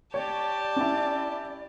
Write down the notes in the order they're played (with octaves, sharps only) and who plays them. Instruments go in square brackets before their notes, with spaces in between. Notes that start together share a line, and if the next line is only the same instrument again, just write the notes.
[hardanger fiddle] G4 A5 [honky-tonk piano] C#5 [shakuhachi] D5
[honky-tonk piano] C#4 E4